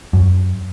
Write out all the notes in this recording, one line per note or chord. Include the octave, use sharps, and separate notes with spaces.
F#2